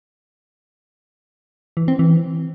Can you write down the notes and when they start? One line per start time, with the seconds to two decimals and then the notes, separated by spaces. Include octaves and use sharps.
1.77 E3
1.88 C4
1.99 E3